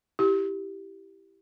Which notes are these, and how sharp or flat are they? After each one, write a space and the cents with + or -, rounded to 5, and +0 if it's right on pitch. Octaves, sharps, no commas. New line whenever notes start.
E4 +0 G4 -5